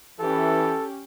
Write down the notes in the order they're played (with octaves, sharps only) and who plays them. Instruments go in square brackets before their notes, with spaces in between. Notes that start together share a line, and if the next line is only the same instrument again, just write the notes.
[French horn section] E3 [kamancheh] C#4 G4 [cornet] A4